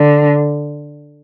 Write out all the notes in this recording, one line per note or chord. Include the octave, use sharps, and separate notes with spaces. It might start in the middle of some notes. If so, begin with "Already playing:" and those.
Already playing: D3